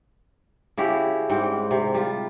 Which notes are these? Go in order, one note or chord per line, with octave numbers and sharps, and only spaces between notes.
C#3 E4 F#4 G4
G#2 G3 C4 G5
C3
G3 F4